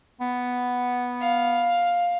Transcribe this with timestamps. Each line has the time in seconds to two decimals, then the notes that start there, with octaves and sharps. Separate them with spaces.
0.20 B3
1.21 F5